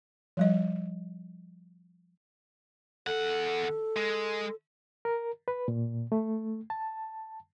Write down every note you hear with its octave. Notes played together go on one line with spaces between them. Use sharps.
F3 G3 D#5
E2 A4 F#5
G#3
A#4
B4
A#2
A3
A5